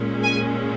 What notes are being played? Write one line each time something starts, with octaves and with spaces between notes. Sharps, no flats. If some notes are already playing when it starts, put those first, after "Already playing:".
Already playing: A#2 G#3 C#4
G#5